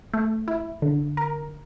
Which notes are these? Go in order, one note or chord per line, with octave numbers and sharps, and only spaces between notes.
A3
E4
D3
A#4